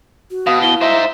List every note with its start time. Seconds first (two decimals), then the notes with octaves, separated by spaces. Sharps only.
0.31 F#4
0.47 B2 F5 D#6
0.62 E4 G7
0.81 D#4 C5 E5